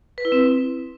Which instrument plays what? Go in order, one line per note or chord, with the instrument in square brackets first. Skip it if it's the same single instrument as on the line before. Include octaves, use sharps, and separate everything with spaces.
[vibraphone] B4
E4
C4